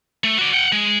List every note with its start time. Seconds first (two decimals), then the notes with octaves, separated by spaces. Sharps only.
0.24 A3
0.39 F#4 D5
0.54 F#5 G5
0.72 G#3